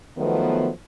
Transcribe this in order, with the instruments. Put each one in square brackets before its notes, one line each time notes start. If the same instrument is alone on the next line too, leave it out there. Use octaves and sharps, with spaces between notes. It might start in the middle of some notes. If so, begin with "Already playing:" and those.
[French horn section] D#3 F3 F#3 A3 B3